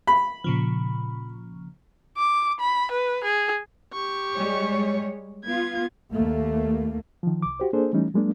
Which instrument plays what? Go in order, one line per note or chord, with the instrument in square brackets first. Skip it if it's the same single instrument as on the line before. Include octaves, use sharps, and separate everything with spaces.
[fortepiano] B5
[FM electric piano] A#2 C#3 F3
[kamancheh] D6
B5
B4
G#4
[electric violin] G4 C#6
[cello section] G3 G#3 C#5
[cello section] B3 F4 [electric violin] G#6
[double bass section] D#2 A3 A#3
[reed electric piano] D#3 F3
C2 D6
F#4 G4 C5
A#3 D4 G#4 A4 C5
E3 G3 A3 C#4 D#4
F#3 G#3 A#3 D4